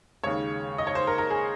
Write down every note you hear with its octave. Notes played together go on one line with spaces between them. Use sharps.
D#2 C#3 G#3 C#5
D#5
C#5
C5
A#4
A#4
G#4